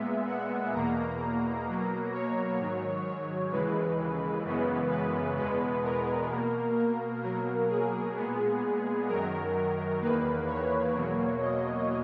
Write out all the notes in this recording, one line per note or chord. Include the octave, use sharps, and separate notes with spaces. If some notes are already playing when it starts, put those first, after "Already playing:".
Already playing: A#2 G#3 B3 E5
F#5
E2 B2 A#3 A#5
B2 F#3 A#3
C#5
G#2 D#3 F#3
C#5
D#2 C#3 E3 G#3 B4
F#2 C#3 E3 G#3 B3
B4
E2 B2 G#3 B3 B4
A#4
B2 A#3
A#4
B2 F#3 A#3 A#4
G#4
A#2 G#3 B3
F#2 D#3 F#3 A#4
E2 D#3 A#3 B4
C#5
E2 B2 F#3 A#3
D#5